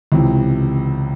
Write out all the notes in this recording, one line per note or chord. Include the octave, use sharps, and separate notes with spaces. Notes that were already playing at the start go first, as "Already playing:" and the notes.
C#2 C3 E3